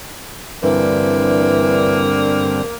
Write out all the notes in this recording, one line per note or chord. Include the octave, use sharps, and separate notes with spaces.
G2 D3 E3 A#3 C4